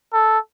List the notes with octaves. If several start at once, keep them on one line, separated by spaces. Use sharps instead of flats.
A4